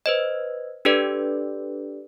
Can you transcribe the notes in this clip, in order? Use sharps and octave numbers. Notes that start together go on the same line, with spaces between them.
B4 C5 D#5
D4 G4 A4 B4 D5